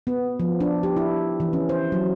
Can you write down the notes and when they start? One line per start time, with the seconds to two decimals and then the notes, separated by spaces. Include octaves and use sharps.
0.07 B3
0.40 F3
0.61 D4
0.83 G4
0.96 E4
1.40 E3
1.53 C#4
1.69 C5
1.92 F#3